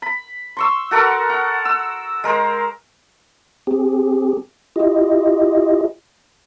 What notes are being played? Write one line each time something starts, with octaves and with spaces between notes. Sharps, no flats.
B5
C6 C#6 E6
F#4 A4 A#4 F#5
F#5
E6
G#3 A#4 C5
C4 G4 G#4
E4 F4 G4 D#5